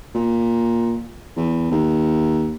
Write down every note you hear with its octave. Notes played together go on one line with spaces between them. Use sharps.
A#2
E2
D#2